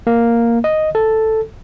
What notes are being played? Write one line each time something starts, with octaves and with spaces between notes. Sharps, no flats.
A#3
D#5
A4